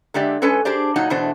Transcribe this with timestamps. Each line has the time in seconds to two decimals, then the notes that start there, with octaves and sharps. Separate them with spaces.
0.14 D3 G#3 G4 D5 E5
0.42 G#3 C#4 A4 B4 G#5
0.65 D4 G4 G#4 C5 D5
0.96 A#2 F#3 D#4 F#5
1.10 E2 B2 A3 D4 C5